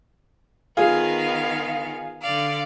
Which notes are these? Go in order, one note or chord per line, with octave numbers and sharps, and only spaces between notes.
D#3 B3 F4 G#4 F5
D3 D5 F5